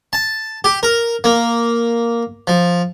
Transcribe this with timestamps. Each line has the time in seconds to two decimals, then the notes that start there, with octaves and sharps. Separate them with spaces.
0.13 A5
0.64 G4
0.83 A#4
1.24 A#3
2.47 F3